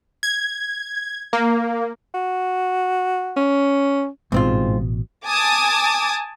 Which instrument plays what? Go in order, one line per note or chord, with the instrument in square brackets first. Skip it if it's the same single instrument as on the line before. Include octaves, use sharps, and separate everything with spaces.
[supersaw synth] G#6
A#3
[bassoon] F#4
[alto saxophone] C#4
[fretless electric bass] A1 B2 [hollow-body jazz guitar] G#2 C4 F4
[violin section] G#5 A5 D6 D#6